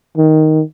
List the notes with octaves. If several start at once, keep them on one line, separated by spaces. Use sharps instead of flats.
D#3